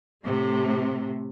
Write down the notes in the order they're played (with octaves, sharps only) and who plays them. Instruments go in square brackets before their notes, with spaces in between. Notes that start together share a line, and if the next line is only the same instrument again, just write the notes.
[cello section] A2 C3 A3